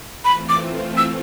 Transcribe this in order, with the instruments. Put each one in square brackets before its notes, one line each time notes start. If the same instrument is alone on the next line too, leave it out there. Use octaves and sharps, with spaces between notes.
[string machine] E3 A3 C4 F4 [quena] B5
[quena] D6
E6